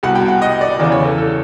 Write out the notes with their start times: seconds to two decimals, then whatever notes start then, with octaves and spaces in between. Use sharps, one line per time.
0.03 C2 B2 F#5
0.15 G5
0.28 F#5
0.42 D#5
0.61 D5
0.79 E2 C#3 E3 D5
0.92 C#5
1.05 A4
1.18 A4